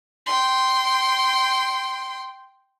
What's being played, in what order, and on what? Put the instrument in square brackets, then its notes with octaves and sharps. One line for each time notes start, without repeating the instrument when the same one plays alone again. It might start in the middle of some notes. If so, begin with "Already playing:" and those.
[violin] G5 C6